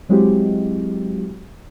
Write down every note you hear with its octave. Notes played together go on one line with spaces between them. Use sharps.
F#3 G#3 C4 E4 F#4 G4